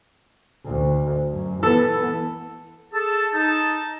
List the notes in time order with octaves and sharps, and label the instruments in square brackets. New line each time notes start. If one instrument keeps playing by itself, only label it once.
[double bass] D2
F#2
[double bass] E3 B3 [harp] A4
[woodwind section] G#4 A4 [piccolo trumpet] A5
[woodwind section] D#4 [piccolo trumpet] A5